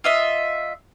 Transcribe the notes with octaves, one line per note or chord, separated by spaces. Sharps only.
F4 D#5 E5